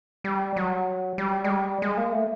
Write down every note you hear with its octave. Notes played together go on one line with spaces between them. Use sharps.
G3
F#3
G3
G#3
G3
G#3
A#3
A3